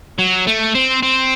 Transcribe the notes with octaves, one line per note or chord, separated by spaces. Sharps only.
F#3
A3
C4
C4